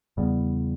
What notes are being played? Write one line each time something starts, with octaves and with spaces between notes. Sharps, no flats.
E2 C#3 G3 B3